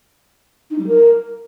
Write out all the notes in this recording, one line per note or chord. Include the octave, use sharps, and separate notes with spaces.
D#4
G3
A#4